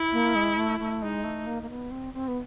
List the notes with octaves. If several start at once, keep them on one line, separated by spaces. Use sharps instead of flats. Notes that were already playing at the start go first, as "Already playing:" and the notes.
Already playing: E4
A#3
G#3
A3
A3
G#3 D#4
A3
A#3
A#3
B3
C4
C4
B3